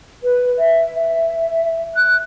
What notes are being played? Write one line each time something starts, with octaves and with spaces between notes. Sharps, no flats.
B4
E5
E5
F#6